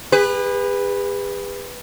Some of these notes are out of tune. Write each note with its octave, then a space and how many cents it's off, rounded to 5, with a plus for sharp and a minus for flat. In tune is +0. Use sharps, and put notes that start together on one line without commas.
G#4 -45 B4 +0